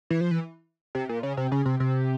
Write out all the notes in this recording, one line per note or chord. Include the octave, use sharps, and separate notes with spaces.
E3
F3
E3
C3
A#2
C#3
C3
C#3
C3
C3